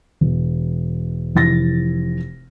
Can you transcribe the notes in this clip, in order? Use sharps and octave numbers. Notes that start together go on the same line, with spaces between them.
E1
F1 E3 A6 A#6